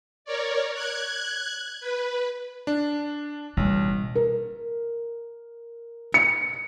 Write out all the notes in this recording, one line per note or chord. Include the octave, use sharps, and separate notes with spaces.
A#4 C#5 D5
F#6 G#6
B4
D4
A1 B2 G3
A#4
C#7